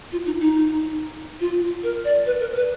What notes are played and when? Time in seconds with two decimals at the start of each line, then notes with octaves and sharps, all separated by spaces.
0.12 F4
0.26 D#4
0.40 D#4
1.40 F4
1.83 A#4
2.05 D5
2.26 B4
2.41 A#4
2.55 B4